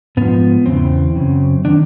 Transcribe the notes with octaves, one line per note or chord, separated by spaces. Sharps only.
G#2 F3 B3
E2 C#3 E3 C4
F#2 C#3
D#3 D4